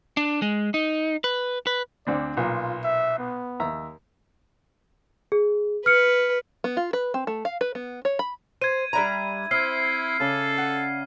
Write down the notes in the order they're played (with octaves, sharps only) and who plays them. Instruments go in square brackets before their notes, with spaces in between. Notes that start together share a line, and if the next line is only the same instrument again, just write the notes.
[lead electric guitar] D4
G#3
D#4
B4
B4
[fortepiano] D2 C4 D4 [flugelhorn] D5
[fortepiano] B1 A#2 [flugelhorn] F4
[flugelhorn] E5
B3
[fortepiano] D#2 E5 A#5
[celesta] G#4
[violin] B4 [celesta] F6 C#7
[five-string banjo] B3
F4
B4
C4
A3
F5
B4
B3
C#5
B5
[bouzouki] C5 [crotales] G#6 D#7
[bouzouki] G3 D4 A#5 [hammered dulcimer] E5 B5
[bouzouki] C4 [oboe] E4 [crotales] F6 C7
[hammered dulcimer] C#3 D5 [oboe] A4
[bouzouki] F#5